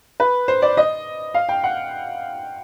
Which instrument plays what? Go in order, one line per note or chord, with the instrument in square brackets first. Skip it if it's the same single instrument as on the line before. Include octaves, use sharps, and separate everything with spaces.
[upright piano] B4
C5
D5
D#5
F5
G5
F#5